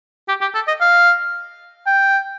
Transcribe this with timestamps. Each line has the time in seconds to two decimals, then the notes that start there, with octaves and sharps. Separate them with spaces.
0.28 G4
0.41 G4
0.55 A4
0.68 D#5
0.81 F5
1.87 G5